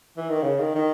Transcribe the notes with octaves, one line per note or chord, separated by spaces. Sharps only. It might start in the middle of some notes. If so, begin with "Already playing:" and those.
E3
D#3
C#3
D#3
D#3